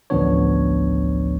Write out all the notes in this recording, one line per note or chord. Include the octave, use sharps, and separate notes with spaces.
A1 D2 F3 B3 D4 C#5